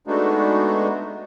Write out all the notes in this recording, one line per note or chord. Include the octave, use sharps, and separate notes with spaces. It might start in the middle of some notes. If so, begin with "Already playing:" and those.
G#3 A3 B3 D4 D#4 F#4